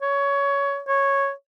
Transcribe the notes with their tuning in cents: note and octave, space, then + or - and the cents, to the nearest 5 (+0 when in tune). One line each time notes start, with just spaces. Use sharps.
C#5 +20
C#5 -5